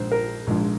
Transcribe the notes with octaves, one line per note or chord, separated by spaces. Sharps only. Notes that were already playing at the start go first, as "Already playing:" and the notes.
Already playing: A#1 G#2 F3 C5
A#4
A#1 G#2 F3